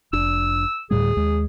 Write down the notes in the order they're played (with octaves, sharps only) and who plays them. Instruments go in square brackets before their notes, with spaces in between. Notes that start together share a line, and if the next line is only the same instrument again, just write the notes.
[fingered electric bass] F1 D4 [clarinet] E6
[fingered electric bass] D2 A2 G3 [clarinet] G#4
[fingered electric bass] D#2 G#3